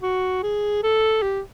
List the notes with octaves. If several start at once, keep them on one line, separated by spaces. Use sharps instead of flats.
F#4
G#4
A4
G4